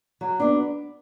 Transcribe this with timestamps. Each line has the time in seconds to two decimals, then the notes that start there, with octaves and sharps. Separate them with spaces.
0.21 F#3
0.40 B3 D4